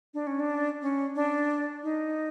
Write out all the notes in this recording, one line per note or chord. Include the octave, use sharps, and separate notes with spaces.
D4
C#4
D4
C#4
D4
D#4